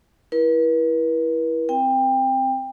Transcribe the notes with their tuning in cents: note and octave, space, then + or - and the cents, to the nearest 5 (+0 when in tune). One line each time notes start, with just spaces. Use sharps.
E4 +0 B4 -45
C4 +0 G5 +20